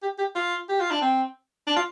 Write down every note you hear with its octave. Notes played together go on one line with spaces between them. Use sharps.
G4
G4
F4
G4
F4
D4
C4
D4
F4